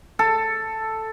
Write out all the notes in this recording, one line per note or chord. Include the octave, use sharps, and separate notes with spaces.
A4